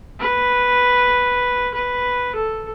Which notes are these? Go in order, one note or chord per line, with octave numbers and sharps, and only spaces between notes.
B4
B4
A4